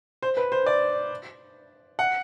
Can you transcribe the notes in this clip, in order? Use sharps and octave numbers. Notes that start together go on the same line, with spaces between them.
C5
B4
C5
D5
F#5